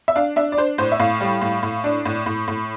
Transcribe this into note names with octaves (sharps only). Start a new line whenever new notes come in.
E5
D4 F5
D4 E5
D5
D4 C5
A2 C5
E5
A2 F5
G3
A2
A2
D4
A2
A2
A2